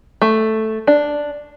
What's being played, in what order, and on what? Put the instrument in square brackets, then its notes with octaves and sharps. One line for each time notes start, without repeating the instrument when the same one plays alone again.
[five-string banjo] A3
D4